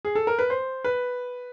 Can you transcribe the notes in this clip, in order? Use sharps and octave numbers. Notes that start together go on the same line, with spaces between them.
G#4
A4
A#4
B4
C5
B4